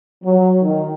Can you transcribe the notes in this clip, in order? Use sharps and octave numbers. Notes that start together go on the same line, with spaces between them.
F#3
D#3